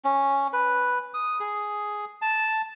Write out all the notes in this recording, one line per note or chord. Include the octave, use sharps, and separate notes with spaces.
C#4
B4
D#6
G#4
A5